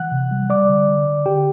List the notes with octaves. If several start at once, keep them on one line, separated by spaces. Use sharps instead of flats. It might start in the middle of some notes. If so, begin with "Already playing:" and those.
Already playing: E3 F#5 F#6
C3
G3
G3 D5 D6
D3
D3
D3
D3 G4 G5